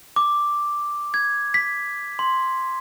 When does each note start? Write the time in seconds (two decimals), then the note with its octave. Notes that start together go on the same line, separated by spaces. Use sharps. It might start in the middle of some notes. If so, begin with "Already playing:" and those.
0.16 D6
1.14 G#6
1.54 B6
2.19 C6